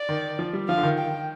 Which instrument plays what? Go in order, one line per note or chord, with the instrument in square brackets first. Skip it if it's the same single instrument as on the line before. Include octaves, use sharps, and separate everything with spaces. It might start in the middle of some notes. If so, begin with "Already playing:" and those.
Already playing: [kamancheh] D5
[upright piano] D#3
F3
G3
[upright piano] F3 [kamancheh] F5
[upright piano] D3
D#3
[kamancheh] G5